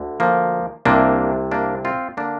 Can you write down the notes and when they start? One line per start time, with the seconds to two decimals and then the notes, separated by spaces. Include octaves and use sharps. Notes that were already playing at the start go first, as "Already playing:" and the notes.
Already playing: D2 D3
0.20 F3 A#3
0.85 C2 C3 A#3 D4
1.52 A#3 D4
1.85 C4 F4
2.17 D3 A#3 D4